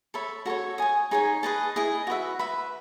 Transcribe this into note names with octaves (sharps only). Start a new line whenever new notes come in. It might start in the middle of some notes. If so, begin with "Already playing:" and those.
A4 C#5 E5 B5
F#4 A4 C#5
C#5 G#5 D#6
D#4 G#4 C#5 G#5
G#4 B4 D#5 A5
E4 G#4 D#5
F#4 B4 E5
B4 E5 B5